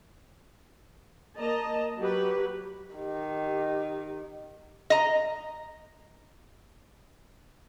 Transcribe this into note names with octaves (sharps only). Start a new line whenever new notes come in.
A#3 D#5 A5 A#5
F#3 G4 B4
D#3 G4
D#5 A#5